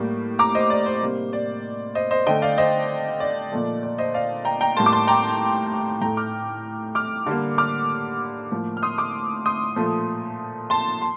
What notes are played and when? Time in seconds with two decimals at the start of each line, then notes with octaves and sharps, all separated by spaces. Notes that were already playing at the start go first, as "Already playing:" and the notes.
Already playing: A2 G3 A#3
0.39 A#5 D6
0.55 C5 D#5
0.70 D5
0.86 C5
1.02 C3 G3 A#3
1.33 D5
1.95 C5 D#5
2.11 C5 D#5
2.26 D3 A3 D#5 G5
2.42 D5 F5
2.58 C5 D#5
3.20 D5
3.52 A#2 F3 A3
3.83 D5
3.98 C5 D#5
4.14 D5 F5
4.45 G5 A#5
4.61 G5 A#5
4.77 A2 G3 A#3 A5 C6
4.86 D6
4.92 A5 C6
5.07 G5 A#5
6.01 A2 A3 G5 A#5
6.17 D6 F6
6.95 D6 F6
7.26 D3 G3 A#3
7.58 D6 F6
8.51 A2 F3 A#3
8.77 F6
8.83 C6 D#6
8.98 D6 F6
9.46 C6 D#6
9.76 A#2 F3 A3
10.70 A5 C6
11.02 C6